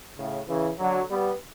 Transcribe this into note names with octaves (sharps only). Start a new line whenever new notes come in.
A2 C#3
C#3 E3
D3 F#3
G3 B3